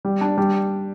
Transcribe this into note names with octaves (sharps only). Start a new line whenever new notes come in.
G3
D4
G3